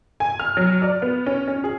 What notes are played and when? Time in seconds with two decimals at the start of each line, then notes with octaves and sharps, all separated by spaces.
0.20 G#5
0.40 F6
0.57 F#3
0.82 D5
1.02 B3
1.26 C#4
1.48 C#4
1.64 G#4